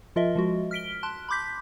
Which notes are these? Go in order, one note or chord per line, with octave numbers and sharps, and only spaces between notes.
F3 F4 A#4 D#5 E5
F3 G#3 F#4
F6 B6 D7 G7
A5 C6 F#6
B5 C6 D6 G6 B6